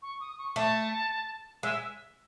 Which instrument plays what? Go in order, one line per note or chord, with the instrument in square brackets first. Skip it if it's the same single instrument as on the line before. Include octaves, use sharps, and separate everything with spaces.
[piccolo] C#6
D#6
C#6
[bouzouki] A3 [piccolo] A5
[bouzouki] G#3 [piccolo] E5